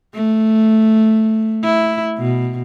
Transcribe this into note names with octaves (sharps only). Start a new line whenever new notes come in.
A3
E4
B2